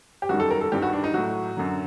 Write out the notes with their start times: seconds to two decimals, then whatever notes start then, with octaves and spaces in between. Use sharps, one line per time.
0.22 G4
0.29 F#2 D#3 G3 F#4
0.40 A4
0.50 A#4
0.61 A4
0.72 G2 D#3 G3 G4
0.82 F#4
0.93 D4
1.04 D#4
1.14 A2 F#3 F#4
1.57 F#2 D3 F#3